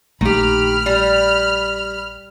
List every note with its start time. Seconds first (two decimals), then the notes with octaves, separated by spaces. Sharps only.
0.21 A#1 D#3 A3 G4 B5 F6
0.86 G3